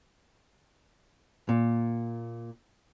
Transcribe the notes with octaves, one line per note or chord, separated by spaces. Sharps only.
A#2